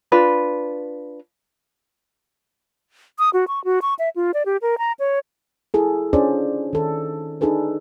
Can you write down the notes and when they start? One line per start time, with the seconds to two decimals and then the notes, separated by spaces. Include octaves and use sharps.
0.12 D4 F4 B4
3.19 D#6
3.33 F#4
3.48 C#6
3.65 F#4
3.82 C#6
3.99 E5
4.16 F4
4.34 D5
4.46 G4
4.62 A#4
4.78 A#5
4.99 C#5
5.74 E4 G#4 A4
6.13 C#4 D4 F4 G#4 C5 D5
6.73 D#3 A4
7.41 D4 D#4 G#4 A4 B4